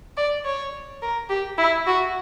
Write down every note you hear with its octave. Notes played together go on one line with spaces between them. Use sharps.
D5
C#5
A#4
G4
E4
F#4